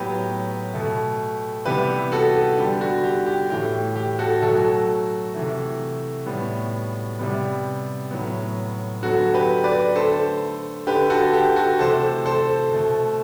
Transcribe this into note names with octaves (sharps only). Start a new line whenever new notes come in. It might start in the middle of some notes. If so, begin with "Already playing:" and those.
Already playing: A2 F#3 B3 G4 B4
B2 A3
C3 E3 G3 B3 G4 B4
F#4 A4
D3 G3 B3 G4
F#4
G4
G4
A2 E3 A3 G4
G4
F#4 A4
B2 F#3 A3 F#4 A4
C3 E3 A3
A2 G3 B3
C3 G3 B3
A2 F#3 B3
D3 F#3 B3 F#4 A4
G4 B4
B4 D5
D3 A3 A4 C5
D3 A3 G4 B4
F#4 A4
G4
F#4 A4
C3 E3 A3 A4 C5
A4 C5
B2 A3